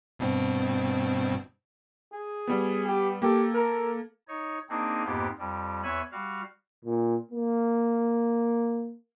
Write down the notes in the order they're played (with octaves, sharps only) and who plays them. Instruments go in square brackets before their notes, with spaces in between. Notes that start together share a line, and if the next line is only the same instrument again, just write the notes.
[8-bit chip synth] G2 B2 C4
[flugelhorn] G#4
[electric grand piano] G3 B3
[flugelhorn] G4
[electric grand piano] A#3 A4 [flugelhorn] G4
[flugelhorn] A#4
[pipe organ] D#4 C#5
A#3 C4 D4 D#4 G#4
F2 G#2 A#3 B3 G4
F2 G3
E2 C#5 E5 G#5 F#6
G3 F#4 F5
[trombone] A#2
A#3